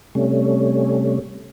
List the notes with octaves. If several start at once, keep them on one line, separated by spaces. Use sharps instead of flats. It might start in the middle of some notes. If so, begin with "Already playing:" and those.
C3 G3 A3 C#4